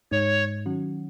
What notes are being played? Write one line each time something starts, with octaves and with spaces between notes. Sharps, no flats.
G#2 G#3 D#4 C#5
D#3 F#3 C#4 F#4